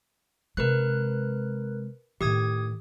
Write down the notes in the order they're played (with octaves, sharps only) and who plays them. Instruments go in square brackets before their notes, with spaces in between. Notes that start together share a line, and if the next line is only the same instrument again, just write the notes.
[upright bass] C3 G#3 [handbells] A#4 B4 F#6
[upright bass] A2 D#3 [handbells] G4 D#6 G#6